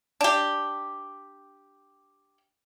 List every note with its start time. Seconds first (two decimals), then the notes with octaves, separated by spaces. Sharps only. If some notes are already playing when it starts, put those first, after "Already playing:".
0.21 D4 G4